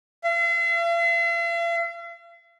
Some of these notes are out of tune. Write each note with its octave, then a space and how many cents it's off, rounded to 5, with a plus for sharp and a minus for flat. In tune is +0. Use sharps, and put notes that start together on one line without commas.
F5 -45